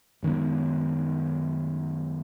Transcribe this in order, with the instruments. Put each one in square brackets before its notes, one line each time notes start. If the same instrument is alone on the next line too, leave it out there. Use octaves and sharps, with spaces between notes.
[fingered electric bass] F#2 D#3 G#3 B3